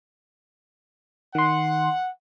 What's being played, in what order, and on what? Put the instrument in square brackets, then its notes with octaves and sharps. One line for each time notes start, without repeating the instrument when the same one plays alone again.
[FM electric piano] D#3 C6 [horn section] F#5